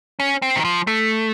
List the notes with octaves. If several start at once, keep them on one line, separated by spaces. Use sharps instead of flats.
C#4
C4
D#3
F3
A3